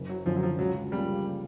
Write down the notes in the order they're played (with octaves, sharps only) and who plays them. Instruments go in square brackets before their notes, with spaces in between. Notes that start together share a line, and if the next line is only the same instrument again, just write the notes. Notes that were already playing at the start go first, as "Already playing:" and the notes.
Already playing: [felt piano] F#1
[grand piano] F#3
[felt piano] F#2 D3 [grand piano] F3
[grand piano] F#3
F3
[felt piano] C#2 [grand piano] F#3
[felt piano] C#3 F3 A#3 [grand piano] G3